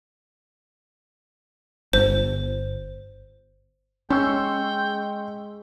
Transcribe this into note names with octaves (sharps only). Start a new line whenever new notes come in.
G1 C5
G#3 C#4 G5 C6 C#6 E6